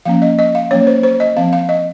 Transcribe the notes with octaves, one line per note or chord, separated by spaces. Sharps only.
F3 A#3 C#4 F5
D#5
D#5
F5
F#3 A#3 C#4 C#5
C5
C5
D#5
F3 C4 F5
F5
D#5